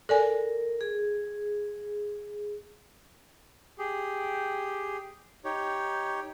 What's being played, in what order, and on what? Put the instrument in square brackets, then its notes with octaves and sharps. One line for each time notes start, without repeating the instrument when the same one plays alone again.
[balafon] A4 D5 G#5 [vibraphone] A#4
[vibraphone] G#4
[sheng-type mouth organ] G4 G#4
D#4 G4 C#5